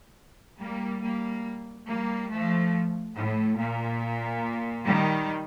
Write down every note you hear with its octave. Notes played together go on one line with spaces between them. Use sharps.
G3 A#3
G3 A#3
G3 A#3
F3 A3
A2
A#2
D#3 G3